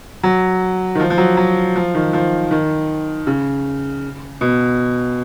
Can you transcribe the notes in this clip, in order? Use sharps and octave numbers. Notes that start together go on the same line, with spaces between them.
F#3
D#3
F3
F3
F#3
F#3
F3
D#3
F3
D#3
C#3
B2